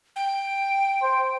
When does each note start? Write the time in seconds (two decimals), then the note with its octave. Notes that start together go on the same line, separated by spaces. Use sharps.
0.16 G5
1.02 C5